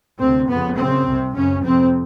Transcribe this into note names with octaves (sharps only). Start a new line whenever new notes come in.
D2 C3 C4
F2 B3
C#3
F#2 C#3 C4
C2 C3
F#2 C#3 C#4
F2 C3 C4